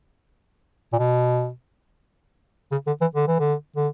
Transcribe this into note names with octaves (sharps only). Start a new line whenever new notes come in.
A#2
B2
C#3
D3
E3
D3
E3
D3
D3